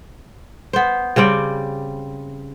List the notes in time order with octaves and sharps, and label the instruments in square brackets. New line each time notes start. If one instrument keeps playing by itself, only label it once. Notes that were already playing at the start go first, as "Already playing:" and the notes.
[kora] B3 C5
C#3 G3 C4 D5